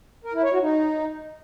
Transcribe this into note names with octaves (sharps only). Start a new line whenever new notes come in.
A#4
E4
C#5
F#4
D#4